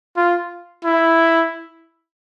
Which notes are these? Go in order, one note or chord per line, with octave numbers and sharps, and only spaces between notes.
F4
E4